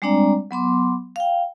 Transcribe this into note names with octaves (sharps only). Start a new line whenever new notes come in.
G3 G#3 C4 D4 D5 A#5
F#3 B3 C6 D6
F5 G5